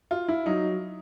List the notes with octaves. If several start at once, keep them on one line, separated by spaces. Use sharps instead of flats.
F4
E4
F#3 D#4